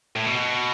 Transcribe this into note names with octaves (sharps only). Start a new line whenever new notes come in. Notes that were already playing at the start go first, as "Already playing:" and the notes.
A2
B2